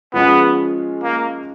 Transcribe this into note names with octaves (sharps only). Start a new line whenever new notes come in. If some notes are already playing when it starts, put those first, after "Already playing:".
F3 G#3 B3 C#4 F4 G#4
A#3